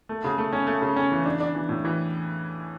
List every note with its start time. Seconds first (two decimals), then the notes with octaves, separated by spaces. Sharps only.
0.09 A3
0.24 C#3
0.38 A3
0.52 C#4
0.67 A3
0.82 C#3
0.96 C#4
1.12 E3
1.25 D4
1.40 D4
1.55 E3
1.69 A2
1.85 E3